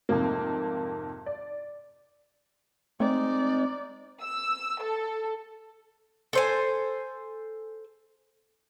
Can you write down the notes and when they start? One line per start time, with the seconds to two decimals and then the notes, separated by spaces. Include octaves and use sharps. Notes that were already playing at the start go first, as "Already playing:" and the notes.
0.09 F2 G#2 C3 A#3
1.26 D5
3.00 G#3 A3 C4 D#4 D5
4.21 E6
4.81 A4
6.33 A4 C5 G#5